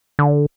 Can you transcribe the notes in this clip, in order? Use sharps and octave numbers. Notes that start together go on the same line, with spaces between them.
D3